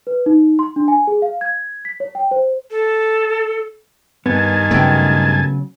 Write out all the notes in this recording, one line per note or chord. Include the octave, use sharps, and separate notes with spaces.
B4
D#4
C6
D4
G#5
G#4
F5
G#6
B6
C#5
G5
C5
A4
G2 D#3 B3 G#5 A5
C#3 F#3 A3 B3 G5